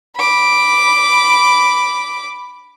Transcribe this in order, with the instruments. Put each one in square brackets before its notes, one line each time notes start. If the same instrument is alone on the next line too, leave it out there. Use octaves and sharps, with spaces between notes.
[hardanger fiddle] B5 D6